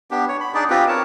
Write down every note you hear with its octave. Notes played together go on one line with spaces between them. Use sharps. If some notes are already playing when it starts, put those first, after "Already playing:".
B3 D4 G4
C#5
B5
D4 D#4 G#4 D5
C4 F4 G4 B4
A#4 C#5 A5